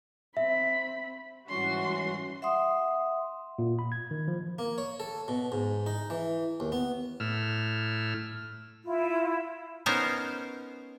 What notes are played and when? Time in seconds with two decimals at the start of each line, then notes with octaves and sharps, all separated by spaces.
0.37 C4 E5 B5
1.49 G#2 E3 G3 C#4 F#4 C6
2.42 E5 F#5 C6 D#6
3.59 A#2
3.79 B5
3.92 G#6
4.11 D#3
4.28 F3
4.59 A#3
4.78 C#5
5.00 A4
5.28 B2
5.52 G#2
5.86 D#4
6.10 E3
6.60 D#2
6.72 B3
7.20 A2 E6 F6
8.84 E4 F4
9.86 B3 C#4 D#4 A#4 C5